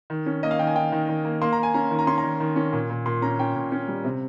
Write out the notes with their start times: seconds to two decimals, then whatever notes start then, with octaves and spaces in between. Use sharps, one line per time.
0.10 D#3
0.26 C#4
0.43 A#3 D#5
0.51 F5
0.59 D#3 G5
0.67 G#5
0.75 D#3 G5
0.92 D#3
1.09 D#3
1.25 A#3
1.42 A#3 C6
1.53 A#5
1.58 A#3
1.63 G#5
1.74 C#4 A#5
1.91 D#3
1.99 A#5
2.07 C#4 C6
2.18 A#5
2.24 D#3
2.40 D#3
2.56 C#4
2.73 A#2
2.90 A#2
3.06 A#2 C6
3.22 C#4 A#5
3.39 C#4 G5
3.55 A#2
3.72 C#4
3.88 G3
4.04 C3